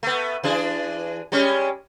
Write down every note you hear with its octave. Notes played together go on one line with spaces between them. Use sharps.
A3 B3
E3 D4 G#4
G3 G#3 C#4